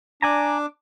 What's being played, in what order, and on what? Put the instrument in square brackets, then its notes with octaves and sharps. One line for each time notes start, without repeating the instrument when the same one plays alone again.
[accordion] D4 D6 [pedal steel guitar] D5 G#5 A#5